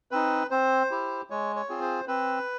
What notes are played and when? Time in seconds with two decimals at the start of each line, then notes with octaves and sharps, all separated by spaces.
0.11 C4 D#4 B4
0.50 C4 C5
0.91 E4 G4
1.30 G#3 C#5
1.56 C#5
1.69 C4 F4 G#4
1.81 C5
2.08 C4 B4